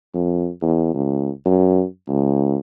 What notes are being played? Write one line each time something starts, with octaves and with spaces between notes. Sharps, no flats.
F2
E2
C#2
F#2
C#2